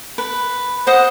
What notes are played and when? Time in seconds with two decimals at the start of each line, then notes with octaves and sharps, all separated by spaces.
0.18 B4
0.87 C5 D#5 F#5